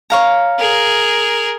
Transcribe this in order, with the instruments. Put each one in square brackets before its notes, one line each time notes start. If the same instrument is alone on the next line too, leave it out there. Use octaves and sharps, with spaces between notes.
[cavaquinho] C#5 F5 A#5
[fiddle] G#4 A#4